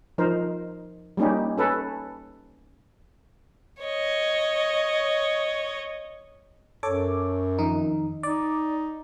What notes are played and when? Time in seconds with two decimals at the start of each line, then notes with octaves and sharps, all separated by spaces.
0.18 F3 D#4 A#4 C5
1.17 G3 A#3 C#4 D#4 G4
1.58 C#4 A4 B4
3.83 C#5 D#5
6.83 F#2 A4 C#5 D6
7.58 F2 D#3 D#4
8.23 D#4 D5